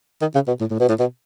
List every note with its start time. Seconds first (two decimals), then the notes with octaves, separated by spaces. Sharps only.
0.21 D#3
0.35 C#3
0.47 B2
0.60 A2
0.70 A2
0.80 B2
0.89 A2
0.99 B2